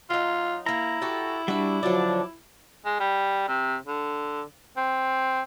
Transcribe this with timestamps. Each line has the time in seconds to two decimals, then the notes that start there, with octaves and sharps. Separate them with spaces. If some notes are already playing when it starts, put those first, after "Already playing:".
0.10 F#3 D#4 F4
0.66 A#3 E4 A#4 A#5
1.02 F#4 G4 A4
1.48 G3 D4 F#4 E5
1.83 D3 F3 F#3 D4 D6
2.85 G#3
3.00 G3
3.48 C3
3.86 D3
4.77 C4